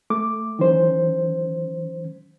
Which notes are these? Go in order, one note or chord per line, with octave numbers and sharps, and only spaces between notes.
A3 D6
D#3 E3 F#3 C#4 C5